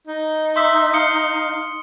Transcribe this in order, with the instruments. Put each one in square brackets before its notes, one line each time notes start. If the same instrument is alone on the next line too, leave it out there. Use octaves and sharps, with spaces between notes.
[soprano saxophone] D#4
[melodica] E5 [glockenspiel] C6 D#6
[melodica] F5 [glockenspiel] D#6 C#7 G7